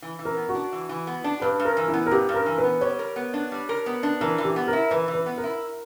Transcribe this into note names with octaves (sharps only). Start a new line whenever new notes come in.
E3
E3
A#4
B3
F#4
D4
E3
E3
B3
D4
G2 B4
G2
A#4
E3
E4
B3
A#4
G2 G4
G2
A#4
E3
B4
B3
G3 C#5
A#4
B3
D4
G3
A#4
B3
D4
E3 A#4
E3
G4
B3
A#4
E4
E3 B4
E3
B4
B3
A#4
E4